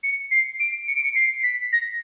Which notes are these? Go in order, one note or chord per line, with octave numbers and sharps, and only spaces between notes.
C#7
C7
D7
C#7
D7
C#7
C7
B6
A#6